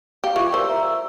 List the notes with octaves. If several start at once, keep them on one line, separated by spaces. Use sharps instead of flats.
G4 F5
E3 F4 C#6 D6
G3 A#4 C5 E6
E5 A#5
E6